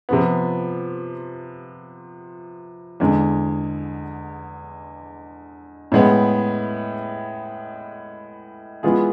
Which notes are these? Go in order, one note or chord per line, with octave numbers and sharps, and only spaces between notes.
C3 F3 B3
E2 D3 G#3
A2 G#3 B3
E3 G#3 B3 F4 G#4